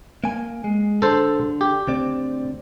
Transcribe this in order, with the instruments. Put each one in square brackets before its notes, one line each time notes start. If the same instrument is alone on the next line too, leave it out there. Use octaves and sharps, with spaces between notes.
[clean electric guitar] A#3 G#5
G#3
[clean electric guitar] D3 [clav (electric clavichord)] A4 C5
[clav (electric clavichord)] G4
[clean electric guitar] D2 C4 D5